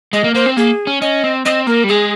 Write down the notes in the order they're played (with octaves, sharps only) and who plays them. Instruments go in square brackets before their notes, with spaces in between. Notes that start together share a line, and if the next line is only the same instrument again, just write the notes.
[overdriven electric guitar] G#3 [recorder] D#5
[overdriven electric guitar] A#3
[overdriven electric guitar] A#3 [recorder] C5
[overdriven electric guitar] C4
[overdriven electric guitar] A#3 [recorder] G#4
[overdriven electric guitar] C#4
[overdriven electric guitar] C#4 [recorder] D#5
[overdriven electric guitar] C4
[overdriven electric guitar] C4 [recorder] D#5
[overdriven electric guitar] A#3 [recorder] A#4
[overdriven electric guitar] G3
[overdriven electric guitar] G#3 [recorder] G#4